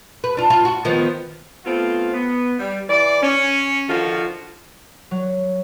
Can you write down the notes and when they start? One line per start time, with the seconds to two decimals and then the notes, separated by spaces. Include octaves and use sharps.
0.24 B4
0.37 D4 F4
0.50 F4
0.65 F#4
0.85 D#3 F3 B3
1.65 A3 B3 C4 F4
2.13 B3
2.58 G3
2.89 E3 D5
3.21 C#4
3.89 D3 D#3 F3 F4 F#4
5.11 F#3